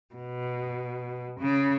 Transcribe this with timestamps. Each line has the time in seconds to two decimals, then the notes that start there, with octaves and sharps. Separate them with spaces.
0.14 B2
1.39 C#3